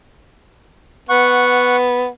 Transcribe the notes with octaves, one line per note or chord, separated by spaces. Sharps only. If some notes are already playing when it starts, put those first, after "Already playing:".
B3 F#5 C#6